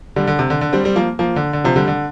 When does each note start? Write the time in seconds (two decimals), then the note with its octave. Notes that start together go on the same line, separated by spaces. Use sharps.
0.16 D3 G3
0.27 D3
0.39 C3
0.50 D3
0.61 D3
0.73 G3 C4
0.84 G3 C4
0.96 F3 A#3
1.19 F3 A#3
1.36 D3
1.53 D3
1.64 C3 F3
1.76 D3 G3
1.88 D3